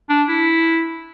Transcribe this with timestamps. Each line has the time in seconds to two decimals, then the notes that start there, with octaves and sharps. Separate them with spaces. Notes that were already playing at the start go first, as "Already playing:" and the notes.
0.09 D4
0.29 E4